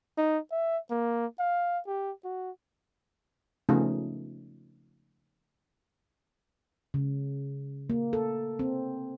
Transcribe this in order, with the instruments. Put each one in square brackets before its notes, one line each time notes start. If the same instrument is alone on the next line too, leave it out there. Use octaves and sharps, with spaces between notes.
[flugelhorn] D#4
E5
A#3
F5
G4
F#4
[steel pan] C#3 F3 A3 B3 C#4 D#4
[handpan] C#3
A#3
A4
C4